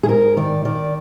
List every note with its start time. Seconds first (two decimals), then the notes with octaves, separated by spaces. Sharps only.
0.03 G#4
0.08 G#2 A#4
0.37 D#3 D5
0.65 D#3 D5